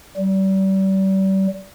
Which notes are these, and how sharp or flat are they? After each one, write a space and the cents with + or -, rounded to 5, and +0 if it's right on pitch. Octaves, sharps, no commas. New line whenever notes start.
G3 -35